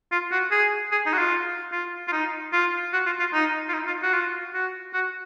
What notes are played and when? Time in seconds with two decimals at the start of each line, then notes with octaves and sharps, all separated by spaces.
0.12 F4
0.31 F#4
0.51 G#4
0.92 G#4
1.06 D#4
1.13 F#4
1.18 F4
1.72 F4
2.08 F4
2.12 D#4
2.53 F4
2.93 F#4
3.06 F4
3.19 F4
3.33 D#4
3.68 F4
3.73 D#4
3.87 F4
4.03 F#4
4.13 F4
4.54 F#4
4.94 F#4